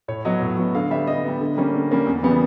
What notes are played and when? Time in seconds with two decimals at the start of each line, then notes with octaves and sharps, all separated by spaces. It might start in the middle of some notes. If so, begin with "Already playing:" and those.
0.08 A2 C#5
0.25 F#3 B3 D#5
0.42 A2
0.57 F#3 B3
0.75 D3 F5
0.91 G3 B3 E5
1.07 D3 D#5
1.24 G3 B3
1.41 D3
1.57 G3 A#3 C#4
1.74 D3
1.91 G3 A#3 C#4
2.07 E2
2.23 C#3 E3 G3 B3